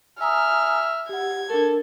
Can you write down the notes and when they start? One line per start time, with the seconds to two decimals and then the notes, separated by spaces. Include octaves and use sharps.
0.21 E5 G#5 A#5 D#6 F6
1.09 G4 F#5 G#6
1.50 D4 A4 A#4